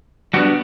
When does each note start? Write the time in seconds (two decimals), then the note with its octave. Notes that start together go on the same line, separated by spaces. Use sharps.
0.34 G3 B3 D4 F#4